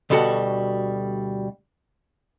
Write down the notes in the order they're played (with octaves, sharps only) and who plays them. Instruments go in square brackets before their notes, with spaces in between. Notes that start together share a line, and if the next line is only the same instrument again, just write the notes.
[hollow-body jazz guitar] D2 B2 G3 F#4 A4 F#5